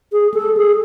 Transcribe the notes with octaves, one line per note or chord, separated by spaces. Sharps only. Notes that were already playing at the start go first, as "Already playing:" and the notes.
G#4
A4
G#4